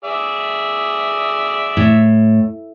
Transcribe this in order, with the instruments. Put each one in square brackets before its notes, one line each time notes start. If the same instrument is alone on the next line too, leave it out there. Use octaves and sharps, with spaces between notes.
[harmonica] G#4 D5 E5
[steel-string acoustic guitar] A2